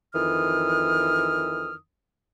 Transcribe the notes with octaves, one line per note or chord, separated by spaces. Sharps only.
F2 D#3 E3 D#6 F6